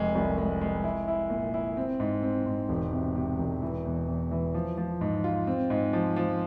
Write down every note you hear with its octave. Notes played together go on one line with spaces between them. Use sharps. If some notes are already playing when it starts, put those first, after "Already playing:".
Already playing: F1 G#3
C2
G#3
G#3
E4
E4
A#2
E4
C4
G#2
C4
G#2
E1
C3
C3
E1
E3
E2
E2
E3
F3
F3
G#2
F4
C4
G#2
F3
F3